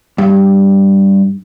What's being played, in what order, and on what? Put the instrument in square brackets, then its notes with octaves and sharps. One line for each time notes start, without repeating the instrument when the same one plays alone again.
[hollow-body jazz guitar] G2